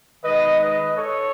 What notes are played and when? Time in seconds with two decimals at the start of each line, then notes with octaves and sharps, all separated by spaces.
0.24 D#3 G#3 D#4 B4 D#5
0.61 B4 D#5
0.97 A4 C#5